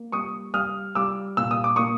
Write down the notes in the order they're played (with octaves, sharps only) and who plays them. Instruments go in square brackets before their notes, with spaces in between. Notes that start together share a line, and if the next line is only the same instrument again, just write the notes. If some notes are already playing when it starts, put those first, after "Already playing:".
Already playing: [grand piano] A#3
G3 C#6 D#6
G3 D#6 F6
G3 D6 E6
A#2 E6
D#6
D6
A#3 C#6 D#6